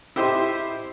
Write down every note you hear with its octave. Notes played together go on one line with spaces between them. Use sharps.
E4 G4 C5 D#5 E5 C6